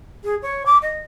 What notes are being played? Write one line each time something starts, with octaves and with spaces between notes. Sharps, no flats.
G#4
C#5
D6
D#5